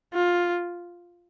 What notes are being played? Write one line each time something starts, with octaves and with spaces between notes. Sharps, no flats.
F4